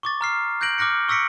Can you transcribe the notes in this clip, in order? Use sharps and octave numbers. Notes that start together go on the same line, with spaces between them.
C#6 D6 A6
A#5 F6 C7
F#6 G6 A#6 D7 F#7
D6 F6 F#6 A#6 C#7
C#6 E6 A#6 B6 C#7 D7